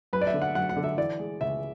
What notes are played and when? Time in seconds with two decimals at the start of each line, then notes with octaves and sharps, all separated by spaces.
0.13 F#2 B4
0.21 D5
0.27 E5
0.34 D3
0.42 F#5
0.55 F#2 F#5
0.69 F#5
0.76 D3
0.84 E5
0.98 E3 D5
1.19 G#3
1.41 C#2 E5